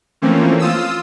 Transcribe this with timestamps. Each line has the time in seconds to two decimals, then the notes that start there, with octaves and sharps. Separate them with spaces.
0.22 E3 F3 A3 A#3 C4 C#4
0.59 F4 D#6 E6